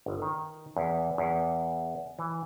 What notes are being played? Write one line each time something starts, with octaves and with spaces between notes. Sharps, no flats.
G1
D#3
E2
E2
E3